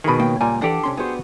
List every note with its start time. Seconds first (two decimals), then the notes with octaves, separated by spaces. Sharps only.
0.04 B2 D#3 G#4 B5
0.20 C#2 A#3 G5
0.41 A#2 G3 G#5 A#5
0.62 E3 D4 G4 A4 D5 F#5
0.84 C3 C#4 C6
0.97 B3 F#4 G#4 C5